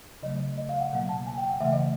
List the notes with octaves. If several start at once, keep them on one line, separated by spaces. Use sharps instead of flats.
C#3 F#3 A3 D#5
D#5
F5
F#5
B2 F#3 A#3
A5
G#5
G5
F#5
C#3 E3 A3 E5
D#5